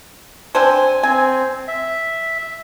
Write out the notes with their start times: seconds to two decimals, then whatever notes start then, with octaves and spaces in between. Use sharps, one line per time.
0.55 C4 D4 C5 G#5
1.03 C4 G#5
1.68 E5